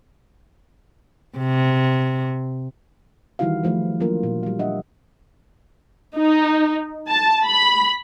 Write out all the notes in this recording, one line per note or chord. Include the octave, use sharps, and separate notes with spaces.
C3
D#3 E3 G3 E4 F#4 F5
E3 F3 A3
F#3 A#3 D4 F4 A#4
A#2
G3 F5
D4 D#5 E5 F#5
D#4
A5
B5